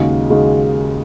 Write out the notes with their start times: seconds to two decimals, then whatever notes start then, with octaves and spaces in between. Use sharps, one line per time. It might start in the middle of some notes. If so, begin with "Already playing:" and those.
Already playing: D#2 C#3 G#3 D#4 F#4
0.30 C#3 G#3 D#4 F#4